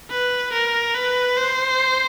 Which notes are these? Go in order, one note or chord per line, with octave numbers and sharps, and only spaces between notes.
B4
A#4
B4
C5